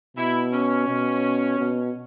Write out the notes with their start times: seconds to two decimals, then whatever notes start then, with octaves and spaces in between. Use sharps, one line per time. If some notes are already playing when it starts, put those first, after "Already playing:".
0.17 B2 E4
0.52 C#4
0.88 B2
1.59 B2